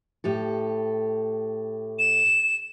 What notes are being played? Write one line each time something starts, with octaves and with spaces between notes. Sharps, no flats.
A2 G4 A4
E7